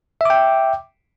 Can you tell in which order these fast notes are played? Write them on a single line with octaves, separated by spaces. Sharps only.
E5 D6 G5